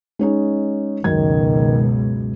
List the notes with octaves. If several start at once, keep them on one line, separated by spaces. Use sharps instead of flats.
G#3 C#4 D#4
C#2 F#2 B2 D#3 G#6